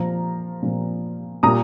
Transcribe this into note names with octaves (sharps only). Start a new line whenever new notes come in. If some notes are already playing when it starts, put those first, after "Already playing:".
Already playing: A#2 F3 F5 A#5
A#2 F3
A#2 G3 A#5 D#6